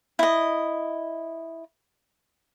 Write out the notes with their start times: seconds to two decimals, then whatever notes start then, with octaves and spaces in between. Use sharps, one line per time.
0.19 E4 D#5